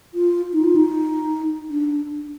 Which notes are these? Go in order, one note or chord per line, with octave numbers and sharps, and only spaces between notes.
F4
D#4
F4
D#4
D4